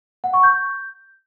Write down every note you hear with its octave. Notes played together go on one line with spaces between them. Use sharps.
F#5
C#6
G6